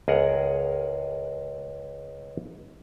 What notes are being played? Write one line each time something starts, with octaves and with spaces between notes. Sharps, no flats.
C#2 G#4 A#4 F#5 A#5